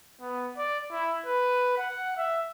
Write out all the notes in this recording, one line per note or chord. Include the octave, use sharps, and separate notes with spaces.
B3
D5
E4
B4
F#5
E5